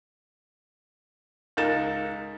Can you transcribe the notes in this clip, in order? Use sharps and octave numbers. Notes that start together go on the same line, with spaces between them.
C#2 D#4 A#4 A6 E7